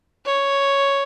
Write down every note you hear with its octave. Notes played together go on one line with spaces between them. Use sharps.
C#5